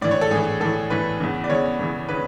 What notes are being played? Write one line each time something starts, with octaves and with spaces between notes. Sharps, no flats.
A2 E3 D5
C#5
A4
A2 E3 G#4
A2 E3 A4
A2 E3 B4
E2 C#3 E3
D5
E2 C#3 E3 C#5
E2 C#3 E3
C#3 E3 B4